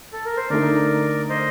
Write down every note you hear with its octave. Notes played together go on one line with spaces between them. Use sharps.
A4
A#4
C5
D3 A3 D#4 A#4 D5
C5 D#5